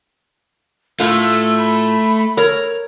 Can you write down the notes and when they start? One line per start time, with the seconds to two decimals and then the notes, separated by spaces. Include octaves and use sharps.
1.00 A2 A3 F4 E6
1.58 B5
2.37 A#4 C#5